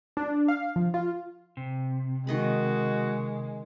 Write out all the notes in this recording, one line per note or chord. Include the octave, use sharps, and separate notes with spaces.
D4
F5
F3
F4
C3
D#3 G#3 F#4 D#5 B5